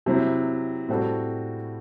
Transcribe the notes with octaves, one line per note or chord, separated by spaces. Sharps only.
C3 F#3 C4 E4
A2 G3 C4 F#4 A4